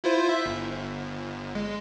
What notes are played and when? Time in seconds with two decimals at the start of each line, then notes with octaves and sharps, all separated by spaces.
0.04 E4 F4 C5
0.29 E5
0.46 G1
1.55 G#3